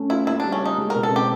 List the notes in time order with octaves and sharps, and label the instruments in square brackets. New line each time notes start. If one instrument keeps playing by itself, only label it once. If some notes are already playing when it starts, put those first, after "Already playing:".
Already playing: [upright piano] A3 C#4
[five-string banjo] E4 [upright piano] F4
[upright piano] A#3 [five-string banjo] E4
[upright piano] G3 [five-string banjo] D4
[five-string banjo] C#4
[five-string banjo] D#4 [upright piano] F4
[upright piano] G#3
[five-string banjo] A#4
[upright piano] B2
[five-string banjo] A4
[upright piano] C4 [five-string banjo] G4